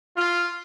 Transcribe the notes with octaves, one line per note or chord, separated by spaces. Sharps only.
F4